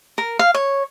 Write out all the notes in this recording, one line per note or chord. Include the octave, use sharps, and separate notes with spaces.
A#4
F5
C#5